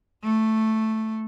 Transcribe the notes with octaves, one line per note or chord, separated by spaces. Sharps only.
A3